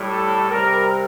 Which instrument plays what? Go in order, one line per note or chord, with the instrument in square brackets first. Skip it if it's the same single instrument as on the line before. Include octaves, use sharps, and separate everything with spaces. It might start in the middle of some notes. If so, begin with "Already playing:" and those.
Already playing: [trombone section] A2 G3
A4
C3 G3 A#4